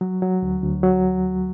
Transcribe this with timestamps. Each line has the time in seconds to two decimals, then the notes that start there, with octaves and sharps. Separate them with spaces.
0.01 F#3
0.22 F#3
0.42 D2
0.63 D2
0.83 F#3